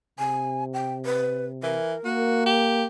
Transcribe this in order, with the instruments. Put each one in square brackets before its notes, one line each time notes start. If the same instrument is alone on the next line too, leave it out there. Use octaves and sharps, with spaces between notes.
[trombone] C3 [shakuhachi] G#5
[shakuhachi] G5
B4
[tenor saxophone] E3 [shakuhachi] A#4
[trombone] A#3 [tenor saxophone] F#4
[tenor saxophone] G4